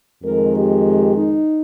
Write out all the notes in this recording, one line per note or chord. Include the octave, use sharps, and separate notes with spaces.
F2 D#3 G#3 A#4
G4
D#4